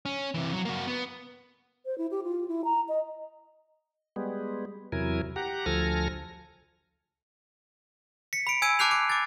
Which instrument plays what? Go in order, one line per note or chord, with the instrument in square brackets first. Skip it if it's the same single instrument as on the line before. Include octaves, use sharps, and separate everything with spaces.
[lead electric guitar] C#4
C3 E3
F#3
A#3 F#4
B3
[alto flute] C5
E4
G4
F4
E4
A#5
D#5
[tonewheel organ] G3 G#3 B3
E2 C3 F#3 E4 A#4 G#5
G4 F#5 A#5
D2 F3 A4 G#5 F6 A#6
[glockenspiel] B6 C#7
B5 D7
G#5 E6 G#6 D7 D#7
A5 D6 F#6 G6 C7 F7
D6
D6 A6